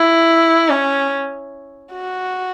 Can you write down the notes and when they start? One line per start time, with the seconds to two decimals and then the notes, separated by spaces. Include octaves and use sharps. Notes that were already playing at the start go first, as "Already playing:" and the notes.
Already playing: E4
0.69 C#4
1.92 F#4